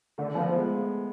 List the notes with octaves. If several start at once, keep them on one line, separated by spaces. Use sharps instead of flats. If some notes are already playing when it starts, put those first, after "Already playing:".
D3 A3
F3 B3
G#3